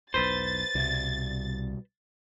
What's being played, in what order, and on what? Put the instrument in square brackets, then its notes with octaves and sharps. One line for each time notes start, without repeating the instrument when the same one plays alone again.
[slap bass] B1 E2 [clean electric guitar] B4 C5 [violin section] A6
[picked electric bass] C2 [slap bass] B2 G3